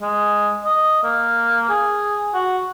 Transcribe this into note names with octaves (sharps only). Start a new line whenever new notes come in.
G#3
D#5
A#3
G#4
F#4